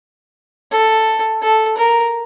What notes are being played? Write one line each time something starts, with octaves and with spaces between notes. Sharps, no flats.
A4
A4
A#4